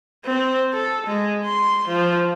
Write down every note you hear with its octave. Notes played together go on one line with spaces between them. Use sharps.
C4
A4
G#3
C6
F3